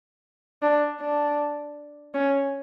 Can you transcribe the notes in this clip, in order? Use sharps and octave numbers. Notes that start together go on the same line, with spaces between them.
D4
D4
C#4